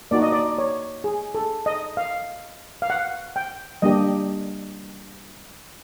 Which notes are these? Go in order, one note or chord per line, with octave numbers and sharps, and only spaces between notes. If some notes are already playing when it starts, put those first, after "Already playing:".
A#3 D#4 F#4 D5
D#5
D5
C#5
G#4
A4
D#5
F5
F5
F#5
G5
G3 A#3 D4 G4 D#5